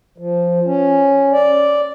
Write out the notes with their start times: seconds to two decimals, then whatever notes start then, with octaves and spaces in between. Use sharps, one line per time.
0.18 F3
0.66 C#4
1.33 D5